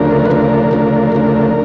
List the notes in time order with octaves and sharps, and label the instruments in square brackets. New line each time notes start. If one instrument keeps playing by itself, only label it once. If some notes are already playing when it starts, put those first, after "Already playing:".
Already playing: [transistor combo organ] D2 C#3 F3 A3 D4 A#4
B4
D2 C#3 F3 A3 D4 A#4
D2 C#3 F3 A3 D4
D2 C#3 F3 A3 D4